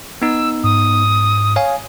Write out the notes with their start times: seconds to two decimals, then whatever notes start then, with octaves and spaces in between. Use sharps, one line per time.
0.22 B3 D#4 E6
0.64 G#2 D#6
1.56 C#5 F5 G#5